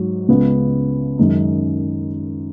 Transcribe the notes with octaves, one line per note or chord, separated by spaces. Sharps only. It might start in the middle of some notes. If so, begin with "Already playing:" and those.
Already playing: G#2 F#3
C#2 C#3 B3
F#2 D#3 G#3 D#4